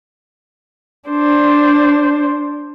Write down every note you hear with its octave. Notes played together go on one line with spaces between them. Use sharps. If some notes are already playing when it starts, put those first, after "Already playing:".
D4 C5